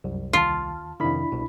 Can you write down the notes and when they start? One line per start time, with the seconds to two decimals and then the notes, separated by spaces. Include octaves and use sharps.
0.04 C2 F#2
0.33 D#2 F4 A5
1.00 F2 C3 D#3 D4 E4 B5
1.32 C2 B2